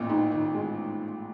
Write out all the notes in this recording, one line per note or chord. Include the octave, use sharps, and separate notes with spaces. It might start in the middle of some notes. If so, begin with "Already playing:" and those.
Already playing: A1 A#2
G#2
D#3
G#3